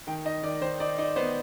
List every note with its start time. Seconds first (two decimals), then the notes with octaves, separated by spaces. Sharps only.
0.07 D#3 G5
0.25 D#4 D#5
0.43 D#3 D5
0.61 D#3 C5
0.80 D#4 D5
0.98 D#4 D5
1.16 B3 C5